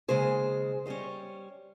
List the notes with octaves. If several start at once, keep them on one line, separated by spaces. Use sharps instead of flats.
D#2 C#3 G#3 G#4 C5
G3 C#4 C5 D#5